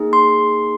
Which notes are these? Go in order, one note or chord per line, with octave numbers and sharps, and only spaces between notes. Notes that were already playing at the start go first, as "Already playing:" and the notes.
Already playing: A#3 D#4 G#4
C6